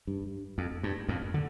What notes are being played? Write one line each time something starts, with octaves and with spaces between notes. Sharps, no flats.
G2
F2
G2
F2 A2
D3